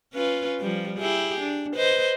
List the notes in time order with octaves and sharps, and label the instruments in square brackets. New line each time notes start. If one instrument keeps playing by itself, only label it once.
[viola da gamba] C#4 F4 B4
F3 G3
E4 G4 G#4
D4
B4 C5 D#5